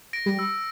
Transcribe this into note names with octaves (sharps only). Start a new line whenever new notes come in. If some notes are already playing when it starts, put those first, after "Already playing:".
A#6 D7
G3
E6